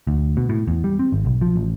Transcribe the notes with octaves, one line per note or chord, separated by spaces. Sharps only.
D2
B2
A2
E2
G3
C4
G#1
B1
F3
A1